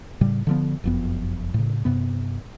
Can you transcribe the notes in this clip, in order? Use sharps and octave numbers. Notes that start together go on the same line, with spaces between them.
A2 C#3 G3
D3 F3 B3
F#1 F2 B3
A2 C#3
G2 C3 B3